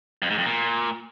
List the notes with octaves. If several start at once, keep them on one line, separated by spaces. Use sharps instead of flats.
F2
G#2
F2
A#2